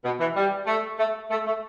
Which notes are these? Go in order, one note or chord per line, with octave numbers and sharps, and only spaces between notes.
B2
E3
G3
A3
A3
A3
A3